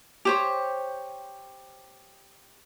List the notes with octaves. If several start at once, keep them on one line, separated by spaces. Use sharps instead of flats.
G4 C5 C#5